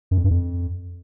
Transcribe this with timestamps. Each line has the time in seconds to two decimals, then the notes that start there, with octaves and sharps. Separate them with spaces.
0.11 F#2
0.18 F2
0.24 G2
0.31 F2